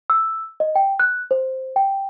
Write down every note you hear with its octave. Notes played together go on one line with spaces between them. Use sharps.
E6
D#5
G5
F#6
C5
G5